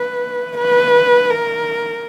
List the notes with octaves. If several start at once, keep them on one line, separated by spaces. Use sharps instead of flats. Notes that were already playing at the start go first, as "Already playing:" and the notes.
Already playing: B4
B4
A#4